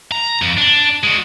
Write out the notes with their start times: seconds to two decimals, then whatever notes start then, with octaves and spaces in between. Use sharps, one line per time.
0.12 A#5
0.42 F2
0.57 D4
1.04 G#3 F#4